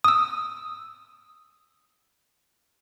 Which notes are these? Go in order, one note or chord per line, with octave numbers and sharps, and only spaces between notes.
D#6 E6